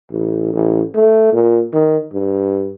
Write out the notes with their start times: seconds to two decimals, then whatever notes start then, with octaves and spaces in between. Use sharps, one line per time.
0.11 A1
0.53 A1
0.94 A3
1.33 A#2
1.73 D#3
2.13 G2